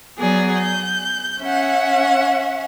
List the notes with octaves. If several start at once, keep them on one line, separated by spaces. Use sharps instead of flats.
F#3 B3 G#4 D5
G6
C#4 E5 F#5